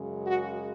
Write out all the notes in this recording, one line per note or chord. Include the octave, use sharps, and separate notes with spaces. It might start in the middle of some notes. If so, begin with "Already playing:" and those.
Already playing: F#2 C#3 G#3
F#4